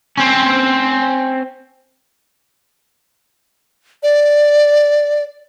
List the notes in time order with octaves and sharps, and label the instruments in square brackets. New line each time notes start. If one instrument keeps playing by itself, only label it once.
[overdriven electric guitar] C4 C#4
[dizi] D5